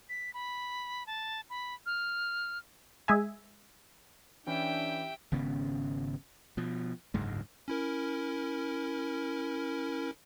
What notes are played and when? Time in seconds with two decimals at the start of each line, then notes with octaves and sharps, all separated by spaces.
0.09 B6
0.34 B5
1.07 A5
1.50 B5
1.86 F6
3.08 G#3 G#4 E5 G#5
4.47 E3 C#4 D4 E4 G4 E5 G5
5.32 G#1 C#3 B3 C#4
6.57 B2 F3
7.14 F#1 D2 G#2 G#3
7.68 C#4 E4 A#4